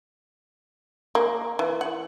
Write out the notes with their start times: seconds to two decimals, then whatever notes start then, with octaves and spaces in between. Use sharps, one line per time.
1.15 A#3
1.59 E3
1.81 F#5